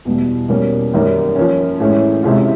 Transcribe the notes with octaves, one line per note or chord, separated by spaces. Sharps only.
E2 B2 G3
B2 G3 A#3 C#4
F#2 D#3 G3 A#3
F3 A#3 C#4
A2 E3 G#3 C#4
C3 E3 G#3 C#4 F4